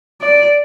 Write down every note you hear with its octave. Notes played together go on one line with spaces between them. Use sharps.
D5